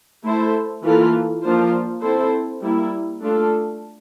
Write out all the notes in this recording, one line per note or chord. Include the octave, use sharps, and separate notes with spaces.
A3 E4 A4 C5
E3 A#3 F4 A4
F3 A#3 D4 F4 C5
C4 E4 A4 C5
G3 A#3 E4
A3 D4 F4 A4